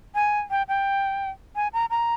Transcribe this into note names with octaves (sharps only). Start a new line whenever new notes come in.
G#5
G5
G5
G#5
A#5
A#5